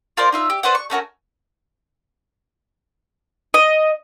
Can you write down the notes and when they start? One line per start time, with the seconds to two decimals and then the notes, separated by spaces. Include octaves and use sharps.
0.17 F4 A#4 C5 D5
0.32 D#4 F4 E5
0.50 G4
0.63 B4 C5 D5 F#5
0.75 C#6
0.90 A3 C#4 F#4 A#4
3.54 D#5